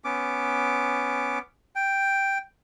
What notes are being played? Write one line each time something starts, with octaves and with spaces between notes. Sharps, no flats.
B3 C#4 D6
G5